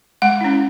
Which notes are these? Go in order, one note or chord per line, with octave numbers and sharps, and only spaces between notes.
G#3 F#5
C#4 E4